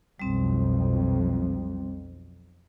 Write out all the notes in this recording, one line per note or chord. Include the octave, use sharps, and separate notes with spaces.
B1 F2 G3 C4